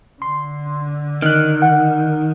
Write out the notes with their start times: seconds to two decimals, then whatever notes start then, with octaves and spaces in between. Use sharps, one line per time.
0.22 D3 C6
1.22 D#3 F6 F#6
1.62 F#5